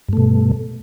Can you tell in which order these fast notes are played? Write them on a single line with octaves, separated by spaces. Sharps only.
G2 A3 B2